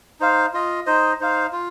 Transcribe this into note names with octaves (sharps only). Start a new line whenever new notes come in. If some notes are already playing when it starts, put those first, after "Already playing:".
D#4 C5 F5
F4 D#5
D#4 C5 D#5
D#4 C5 F5
F4